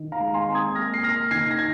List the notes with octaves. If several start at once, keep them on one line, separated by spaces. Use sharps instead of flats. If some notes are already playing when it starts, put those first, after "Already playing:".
Already playing: D#3
F5 A#5
G#3
G#5 C6
C4
D#6 G#6
A#3 F6 A#6
C7
A#3 F6 A#6
D#3 G#6 C7
A#6
G#6